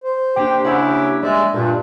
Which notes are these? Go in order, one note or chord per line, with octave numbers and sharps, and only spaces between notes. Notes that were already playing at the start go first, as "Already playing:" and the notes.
C5
A#3 D4 G4
C#3 E4 G4 F#5 E6
G3 G#3 D5 E5
G2 A#2 D4